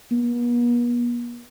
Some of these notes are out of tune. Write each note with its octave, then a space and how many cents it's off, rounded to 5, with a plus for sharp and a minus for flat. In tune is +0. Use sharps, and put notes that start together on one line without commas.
B3 -45